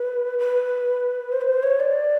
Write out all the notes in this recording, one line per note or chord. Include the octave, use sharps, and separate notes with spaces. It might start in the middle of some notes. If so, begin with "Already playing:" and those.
Already playing: B4
B4
C5
B4
C5
C#5
D5